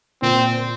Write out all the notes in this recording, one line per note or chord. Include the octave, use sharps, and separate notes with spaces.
A#2 C4